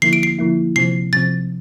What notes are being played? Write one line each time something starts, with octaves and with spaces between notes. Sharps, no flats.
D3 F3 A#3 E4 C7
D7
C7
D3 F3 A#3 E4
C3 F3 C4 C7
C3 F3 C4 A6